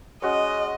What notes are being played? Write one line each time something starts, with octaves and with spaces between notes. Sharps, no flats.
G#3 C#4 F#4 C#5 D#5